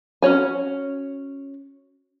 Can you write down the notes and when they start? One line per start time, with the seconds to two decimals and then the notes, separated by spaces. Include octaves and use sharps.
0.22 C#4 F#4 C#5 G#5